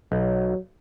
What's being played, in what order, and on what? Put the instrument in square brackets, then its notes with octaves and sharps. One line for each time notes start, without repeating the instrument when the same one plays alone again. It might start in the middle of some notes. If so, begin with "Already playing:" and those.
[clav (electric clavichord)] B1 [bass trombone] F#3